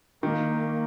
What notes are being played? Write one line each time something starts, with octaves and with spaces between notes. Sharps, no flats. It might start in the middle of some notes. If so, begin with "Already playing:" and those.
D#3 A#3
A#3